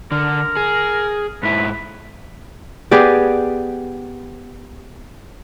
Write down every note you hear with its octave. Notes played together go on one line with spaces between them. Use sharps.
D3 A#4
G#4
G#2 E4 B4
B3 G4 G#4 D5